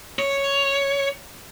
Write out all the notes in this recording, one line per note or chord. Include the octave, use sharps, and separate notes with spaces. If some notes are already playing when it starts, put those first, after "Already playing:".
C#5